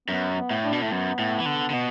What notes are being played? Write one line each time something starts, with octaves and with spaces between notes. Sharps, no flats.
F#2 B3
B3
A2
D4
B2
A2 A3
F#2 B3
A2
E3
D3
D3
B2